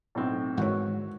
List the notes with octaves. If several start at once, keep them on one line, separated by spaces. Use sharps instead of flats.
B1 A2 C4
G#2 D#3 E3 F#4 C#5